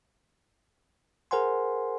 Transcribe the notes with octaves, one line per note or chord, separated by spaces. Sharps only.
G#4 A#4 C5 F#5 G#5 C6